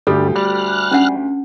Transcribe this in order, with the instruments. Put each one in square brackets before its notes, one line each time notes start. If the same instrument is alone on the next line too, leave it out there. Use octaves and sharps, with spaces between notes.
[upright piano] D2 G4 [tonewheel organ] G2 D3 [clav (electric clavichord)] G3 [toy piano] A4
[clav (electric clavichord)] G3 [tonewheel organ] F6 F#6
[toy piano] C#4 D4 F#5